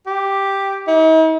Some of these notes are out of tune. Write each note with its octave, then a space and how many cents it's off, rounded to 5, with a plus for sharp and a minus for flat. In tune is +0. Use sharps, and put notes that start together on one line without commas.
G4 +0
D#4 +45